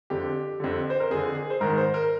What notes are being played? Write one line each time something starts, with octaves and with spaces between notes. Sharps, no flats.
F2 D3 G4
F2 D3
C5
A#4
F2 D3 G#4
G#4
C5
G#2 D#3 A#4
C5
A#4